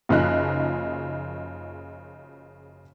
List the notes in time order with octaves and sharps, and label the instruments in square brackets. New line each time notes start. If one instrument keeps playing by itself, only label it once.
[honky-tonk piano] F#1 C#3 F3 D#4 F#6